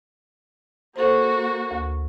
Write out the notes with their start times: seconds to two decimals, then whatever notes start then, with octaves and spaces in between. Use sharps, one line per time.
0.96 A#3 F#4 A4 C5
1.71 D2